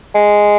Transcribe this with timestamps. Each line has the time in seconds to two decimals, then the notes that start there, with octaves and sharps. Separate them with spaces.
0.15 G#3